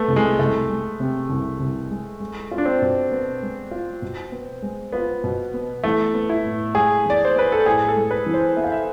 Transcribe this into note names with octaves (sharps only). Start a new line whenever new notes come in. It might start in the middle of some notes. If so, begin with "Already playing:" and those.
Already playing: A3 B3
C2
G#3
C2 A3
G#3
C3
C2
C2
G#3
G#3
F4
D4
C4
B2
B3
G#3
F4
B2
B3
G#3
B3 F4
B2
B3
E3 A3
B3
E4
A2
G#3 G#4
E3 D5
C5
B3 B4
A4
A2 G#4
A4
G#3
B4
E3
C5
B3 E5
F5
E5